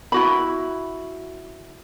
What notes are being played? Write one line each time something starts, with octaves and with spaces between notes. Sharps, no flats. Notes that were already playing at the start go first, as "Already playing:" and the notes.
E4 F#4 B5